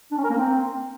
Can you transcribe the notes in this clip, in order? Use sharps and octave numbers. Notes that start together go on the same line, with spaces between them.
D4
C#4
A#4
A#3
C4